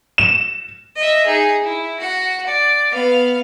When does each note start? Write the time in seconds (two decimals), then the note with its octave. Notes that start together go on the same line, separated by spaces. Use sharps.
0.18 E7
0.96 D#5 E5
1.26 D#4 G#4
1.63 E4
2.00 F#4 F#5
2.46 D5
2.92 B3 F5